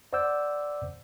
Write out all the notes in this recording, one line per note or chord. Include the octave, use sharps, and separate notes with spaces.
C5 D5 F#5 D6 E6 G6